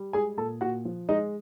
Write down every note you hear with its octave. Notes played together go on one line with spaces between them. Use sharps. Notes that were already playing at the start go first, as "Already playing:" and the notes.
Already playing: G3
G#3 G#4 G#5
A#2 A4 A5
A#2 F#4 F#5
F3
G#3 D#4 D#5